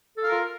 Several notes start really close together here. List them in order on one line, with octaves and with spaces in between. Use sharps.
A4 F5 A#4 F4